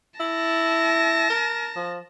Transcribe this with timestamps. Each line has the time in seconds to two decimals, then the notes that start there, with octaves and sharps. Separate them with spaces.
0.20 E4 A5 A#6
1.30 A#4
1.76 F3